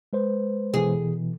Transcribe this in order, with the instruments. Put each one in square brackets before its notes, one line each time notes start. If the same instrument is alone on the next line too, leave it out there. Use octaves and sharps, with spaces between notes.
[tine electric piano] G#3 B4 C5
[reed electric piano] B2 E3 [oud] G#4